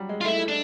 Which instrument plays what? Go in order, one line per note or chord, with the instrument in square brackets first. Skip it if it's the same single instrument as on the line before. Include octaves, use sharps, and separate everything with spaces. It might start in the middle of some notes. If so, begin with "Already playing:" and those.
Already playing: [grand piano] F#3 G3
G#3
[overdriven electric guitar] F4
[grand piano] A3 [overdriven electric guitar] E4
[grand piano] A3
[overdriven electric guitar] D4